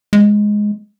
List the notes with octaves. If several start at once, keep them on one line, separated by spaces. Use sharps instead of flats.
G#3